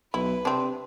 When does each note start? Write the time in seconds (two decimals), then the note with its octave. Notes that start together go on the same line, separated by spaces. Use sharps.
0.14 B1 E4 B4
0.45 C3 C4 D4